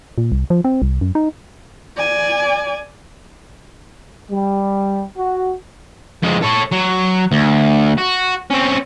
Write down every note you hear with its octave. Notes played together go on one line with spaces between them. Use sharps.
A#2
C2
F3
C4
C2
F#2
D#4
D5 G#5
G3
F#4
F2 G#3
A4 C#5
F#3
D2
F#4
C4 C#4